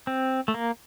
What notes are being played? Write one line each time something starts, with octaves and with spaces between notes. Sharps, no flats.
C4
A3
A#3